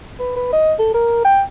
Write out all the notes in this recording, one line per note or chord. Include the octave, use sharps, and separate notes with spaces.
B4
B4
D#5
A4
A#4
G5